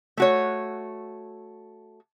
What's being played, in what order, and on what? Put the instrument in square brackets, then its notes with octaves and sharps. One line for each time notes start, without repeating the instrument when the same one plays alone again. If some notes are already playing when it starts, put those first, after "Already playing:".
[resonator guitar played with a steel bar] A3 F#4 C#5